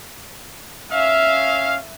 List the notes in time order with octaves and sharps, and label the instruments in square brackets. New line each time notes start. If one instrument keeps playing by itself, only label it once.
[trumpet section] C#4 F5 [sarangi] E5